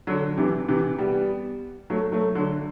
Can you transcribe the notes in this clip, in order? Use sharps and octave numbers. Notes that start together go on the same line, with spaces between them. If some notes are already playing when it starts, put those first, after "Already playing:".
D3 F#3
C3 E3
C3 E3
G3 B3
F#3 A3
F#3 A3
D3 F#3